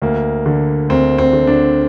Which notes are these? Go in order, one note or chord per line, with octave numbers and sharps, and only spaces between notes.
D2 A#3
D3
D2 C4
C4
D3
D4